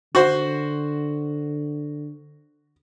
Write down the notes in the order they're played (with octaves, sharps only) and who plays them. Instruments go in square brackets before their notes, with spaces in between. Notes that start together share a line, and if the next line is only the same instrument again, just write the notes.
[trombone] D3 [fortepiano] F#4 C5